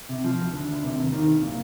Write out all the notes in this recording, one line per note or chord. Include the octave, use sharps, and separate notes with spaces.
C3
F3
D2
D3
D2
C3
D#2
D#3
C2
A#2